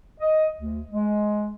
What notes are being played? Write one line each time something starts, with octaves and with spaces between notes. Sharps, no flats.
D#5
D2
G#3